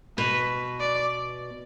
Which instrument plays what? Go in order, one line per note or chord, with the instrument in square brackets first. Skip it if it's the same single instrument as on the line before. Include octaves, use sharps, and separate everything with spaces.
[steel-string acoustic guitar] B2 [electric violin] B4
[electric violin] D5